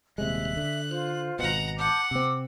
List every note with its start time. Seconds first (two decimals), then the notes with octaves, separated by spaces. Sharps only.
0.18 D#1 C3 G#3 E5 F#6
0.57 D3
0.90 F4 C5
1.39 G#1 B2 F#5 A#5
1.78 F#5 A5 D6 G6
2.11 C3 C4 D6 E6